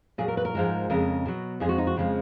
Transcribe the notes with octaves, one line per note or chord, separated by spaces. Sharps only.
A#2 F#3 G#4
A#4
B4
A#4
G#2 F3 G#3
F2 C#3 G#3 A#4
B2 F#3
F2 F3 G#3 G#4
F#4
D#4
F#4
F2 C#3 F3 G#3